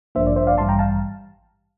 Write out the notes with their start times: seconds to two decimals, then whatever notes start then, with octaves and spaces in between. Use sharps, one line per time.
0.15 A1 G2 F3 A#3 D4 C5 E5
0.27 D5
0.36 C5 E5
0.47 D5 F5
0.58 A1 G2 E3 G3 A5 C6
0.69 G5 A#5
0.79 F5 A5